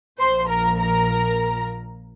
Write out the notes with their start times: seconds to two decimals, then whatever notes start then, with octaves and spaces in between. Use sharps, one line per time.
0.19 A#1 A#2 F3 C5 C6
0.48 A#4 A#5
0.79 A#4 A#5